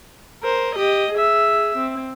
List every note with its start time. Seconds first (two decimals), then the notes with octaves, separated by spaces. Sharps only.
0.43 A#4 C5
0.75 G4 D#5
1.13 G#4 E5
1.77 C4